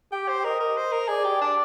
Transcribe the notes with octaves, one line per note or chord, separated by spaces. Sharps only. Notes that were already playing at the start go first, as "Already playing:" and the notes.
G4 G5
C5
A#4 D#5
A#4
C5
A#4
G#4 D5
G4
D4